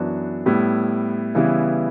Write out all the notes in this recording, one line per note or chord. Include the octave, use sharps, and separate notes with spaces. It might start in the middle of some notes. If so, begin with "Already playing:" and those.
Already playing: F#2 E3 B3 D4 F#4
A2 G3 B3 E4
C#3 E3 G3 B3 E4